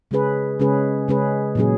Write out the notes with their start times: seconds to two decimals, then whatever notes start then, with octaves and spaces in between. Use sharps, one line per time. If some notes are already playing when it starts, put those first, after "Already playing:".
0.11 C#3 G#3 C#4 G#4 B4
0.60 C#3 G#3 C#4 G#4 B4
1.08 C#3 G#3 C#4 G#4 B4
1.55 A#2 F#3 C#4 G#4